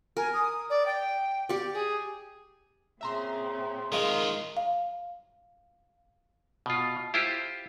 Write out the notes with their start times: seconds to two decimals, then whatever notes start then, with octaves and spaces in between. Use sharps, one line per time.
0.17 A#4 G#5
0.33 D#6
0.69 D5
0.85 G5
1.49 G4 D5
1.73 G#4
3.01 A#2 C#3 C4 E5 A#5 C6
3.92 D#3 G#3 F4 A#4 F5
4.57 F5
6.66 B2 F4
7.14 E4 F4 G4 C5